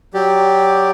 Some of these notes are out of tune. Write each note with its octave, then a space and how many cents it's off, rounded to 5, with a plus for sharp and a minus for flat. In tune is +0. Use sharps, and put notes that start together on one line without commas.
F#3 +15 G4 +0 D5 +0